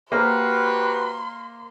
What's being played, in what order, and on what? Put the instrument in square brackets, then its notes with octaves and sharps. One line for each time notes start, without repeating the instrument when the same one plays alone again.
[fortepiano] A#3 C5 F6 [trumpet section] F#4 G4 B4 [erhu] C6